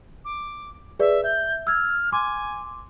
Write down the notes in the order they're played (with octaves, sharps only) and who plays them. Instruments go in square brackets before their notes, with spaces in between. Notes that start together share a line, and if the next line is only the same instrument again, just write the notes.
[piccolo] D6
[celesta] G#4 B4 D5 [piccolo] E5
[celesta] E5 [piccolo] G6
[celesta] E6 G#6 [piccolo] F6
[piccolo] G#5 [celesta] C6 D6